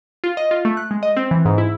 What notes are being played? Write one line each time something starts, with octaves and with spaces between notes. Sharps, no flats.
F4
D#5
F4
A3
F#6
G#3
D#5
C4
E3
G#2
E4